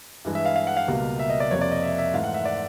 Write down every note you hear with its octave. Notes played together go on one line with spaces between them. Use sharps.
G2 E3 G#3
E5
F5
F5
F#5
F5
C#2 B2 G3 A#3
E5
D#5
D5
F2 C3 F3 A#3 C#5
D5
D#5
E5
E5
G#2 E3 A3 F5
F#5
E5
D5